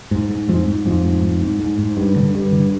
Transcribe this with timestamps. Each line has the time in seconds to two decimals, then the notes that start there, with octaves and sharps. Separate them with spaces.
0.11 G#2
0.31 G#2
0.48 F2 G#2 F3
0.67 G#2
0.86 F2 G#2 F3
1.05 G#2
1.23 G#2
1.42 G#2
1.60 G#2
1.79 G#2
1.97 G2
2.16 D3
2.35 G2
2.52 D3